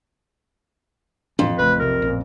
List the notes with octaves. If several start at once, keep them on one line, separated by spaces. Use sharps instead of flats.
F2 A2 E3 D4
A1 C#3 A3 B4
B1 C3 A#4
A1 A#2